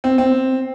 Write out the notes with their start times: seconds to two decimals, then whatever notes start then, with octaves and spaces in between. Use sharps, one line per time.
0.04 C4
0.18 C4